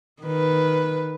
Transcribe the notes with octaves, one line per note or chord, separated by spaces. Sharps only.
D#3 B4